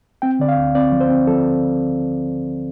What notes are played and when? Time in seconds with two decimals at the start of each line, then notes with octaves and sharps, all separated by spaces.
0.22 C4 G5
0.39 D3 D5
0.49 F5
0.57 D2
0.75 C4 D5
0.92 F3
1.01 C5
1.09 C4
1.27 F3 A4